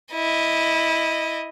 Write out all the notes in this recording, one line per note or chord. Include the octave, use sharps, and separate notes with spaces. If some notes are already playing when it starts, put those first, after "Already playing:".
E4 D#5